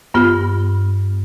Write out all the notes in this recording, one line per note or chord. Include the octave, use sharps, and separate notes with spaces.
G2 B3 F4